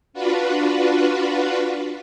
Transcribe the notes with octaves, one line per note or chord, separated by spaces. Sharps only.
D4 F4 F#4 B4